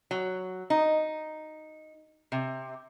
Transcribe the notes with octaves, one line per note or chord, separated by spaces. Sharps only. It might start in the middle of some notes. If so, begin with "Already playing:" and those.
F#3
D#4
C3